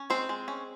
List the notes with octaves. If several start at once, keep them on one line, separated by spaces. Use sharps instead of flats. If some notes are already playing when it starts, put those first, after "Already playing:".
Already playing: C#4
G#3 C4 C5
G#3
C#4